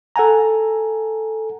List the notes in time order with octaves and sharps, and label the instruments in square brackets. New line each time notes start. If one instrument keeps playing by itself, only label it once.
[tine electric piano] A4 F#5 G#5 A#5